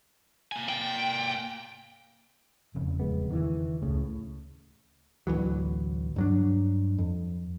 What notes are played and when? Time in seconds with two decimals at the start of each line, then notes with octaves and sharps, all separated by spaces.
0.52 A#3 G#5
0.69 G5
2.74 E1 F2 C#3
3.00 D1 G#3 B3
3.31 D#3 E3
3.82 D1 C#2 A2 C#3
5.27 A1 D2 E3 F#3
6.16 G2 F#3 D4
6.98 F2